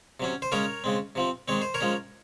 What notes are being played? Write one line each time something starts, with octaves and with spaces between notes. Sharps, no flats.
C3 F#3 C#4
C5
C#3 G#3 C#4 A#4 C#5
C#3 G#3 C4
C3 F3 C4
D#3 G#3 C4 C#5
C5
A#4 C#5
F3 G#3 C#4